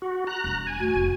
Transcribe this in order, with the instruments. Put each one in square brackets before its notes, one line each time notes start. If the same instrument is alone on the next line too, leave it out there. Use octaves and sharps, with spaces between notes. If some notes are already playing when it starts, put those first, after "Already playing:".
[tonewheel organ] F#4
A#5 F#6
[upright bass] E1 G3
[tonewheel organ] G#5
[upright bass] A2 [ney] F#4
[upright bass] F1 B3